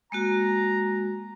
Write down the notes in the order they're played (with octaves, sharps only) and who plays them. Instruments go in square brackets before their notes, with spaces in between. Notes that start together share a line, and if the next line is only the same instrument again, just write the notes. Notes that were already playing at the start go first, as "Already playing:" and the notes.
[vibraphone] G#3 A#3 F#4 [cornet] A#5